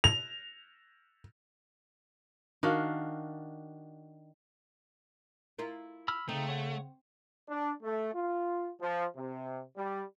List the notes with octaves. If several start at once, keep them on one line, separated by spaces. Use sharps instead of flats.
F7
D#3 D4 F#4 F5
E4 F4 A#4
B5 E6 F6
C#3 A3 C4 D#4
C#5 F#5
D4
A3
F4
F3
C3
G3